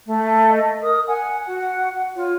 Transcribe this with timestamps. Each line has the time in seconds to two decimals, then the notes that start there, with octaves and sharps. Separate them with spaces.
0.06 A3
0.49 D#5
0.82 A#4 D#6
1.08 F#5 G#5
1.47 F#4
2.16 F4 C#5